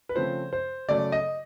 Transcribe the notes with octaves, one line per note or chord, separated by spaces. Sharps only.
B4
C#3 F3 A3 C4 C5
C5
C#3 F#3 A3 D5
D#5